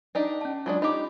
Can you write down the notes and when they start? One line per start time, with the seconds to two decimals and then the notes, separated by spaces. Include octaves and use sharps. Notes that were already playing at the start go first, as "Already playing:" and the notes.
0.15 D4 D#4 G4
0.41 C#4 A5
0.66 F#3 G#3 D4 F4
0.82 D#4 G4 B5 D6